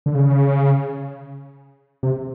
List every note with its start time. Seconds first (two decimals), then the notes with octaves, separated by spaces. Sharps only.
0.06 D3
0.15 C#3
2.03 C3